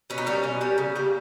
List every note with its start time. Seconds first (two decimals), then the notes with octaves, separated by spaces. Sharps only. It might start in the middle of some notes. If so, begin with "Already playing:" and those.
0.10 B2 C#4
0.18 D#4
0.27 G3 A#3 C#4
0.43 B2
0.61 G3 A#3
0.78 C#3
0.96 G3 A#3